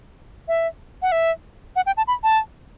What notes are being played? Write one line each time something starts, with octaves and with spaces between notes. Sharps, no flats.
E5
F#5
E5
F#5
G5
A5
B5
A5